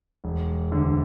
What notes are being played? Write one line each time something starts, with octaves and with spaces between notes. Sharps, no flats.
E1
D2 D3